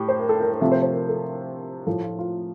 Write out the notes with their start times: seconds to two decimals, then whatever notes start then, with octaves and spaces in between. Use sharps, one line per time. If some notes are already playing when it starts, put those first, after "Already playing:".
Already playing: A2 G4
0.08 C5
0.19 A#4
0.29 A4
0.40 A#4
0.51 A#4
0.61 C3 F3 A3 E5
0.72 C5
0.83 C5
0.93 A#4
1.09 A4
1.86 A2 F3 A3 A4
2.03 F4
2.19 F4